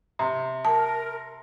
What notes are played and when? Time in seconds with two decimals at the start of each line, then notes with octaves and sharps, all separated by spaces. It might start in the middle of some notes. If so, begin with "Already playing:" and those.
0.19 C3
0.65 A#4 A5